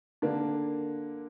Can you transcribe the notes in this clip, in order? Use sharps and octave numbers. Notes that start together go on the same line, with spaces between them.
D3 A#3 D4